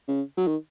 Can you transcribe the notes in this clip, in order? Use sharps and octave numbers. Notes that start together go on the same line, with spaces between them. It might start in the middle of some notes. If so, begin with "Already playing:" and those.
C#3
F#3
D#3